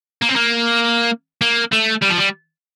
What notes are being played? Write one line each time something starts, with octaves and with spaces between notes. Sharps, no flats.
A#3
C4
A#3
A#3
A3
G3
F3
G3